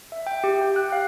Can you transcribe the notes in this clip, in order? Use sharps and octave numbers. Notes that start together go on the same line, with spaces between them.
E5
G5
G4
G5
F#6
F5